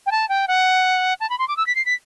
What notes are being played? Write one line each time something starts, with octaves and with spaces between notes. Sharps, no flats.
G5
A5
G5
F#5
A5
B5
C6
D6
E6
B6
C7
B6